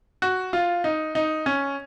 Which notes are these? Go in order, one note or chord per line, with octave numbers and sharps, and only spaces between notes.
F#4
F4
D#4
D#4
C#4